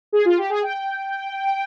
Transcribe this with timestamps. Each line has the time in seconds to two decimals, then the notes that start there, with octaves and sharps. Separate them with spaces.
0.12 G#4
0.25 F4
0.38 G4
0.50 G#4
0.62 G5